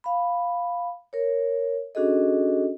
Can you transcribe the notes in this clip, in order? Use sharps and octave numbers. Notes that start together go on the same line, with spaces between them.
F5 B5
A#4 C#5
C#4 D4 F#4 G#4 A4 D#5